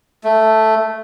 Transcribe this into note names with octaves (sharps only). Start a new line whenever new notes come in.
A3